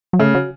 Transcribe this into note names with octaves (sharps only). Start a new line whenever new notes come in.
F#3
C#3 A3
F#3